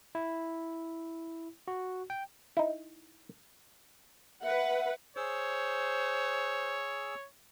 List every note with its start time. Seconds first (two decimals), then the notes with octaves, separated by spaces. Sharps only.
0.15 E4
1.68 F#4
2.10 G5
2.57 D#4 E4
4.43 B4 E5 F#5
5.17 G#4 C5 C#5 E6